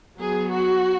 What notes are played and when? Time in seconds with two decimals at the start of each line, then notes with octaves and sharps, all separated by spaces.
0.18 F#3 B3 G#4
0.52 F#4